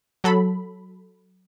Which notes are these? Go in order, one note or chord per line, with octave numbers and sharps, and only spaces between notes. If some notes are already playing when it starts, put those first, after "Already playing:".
F#3 A4 B5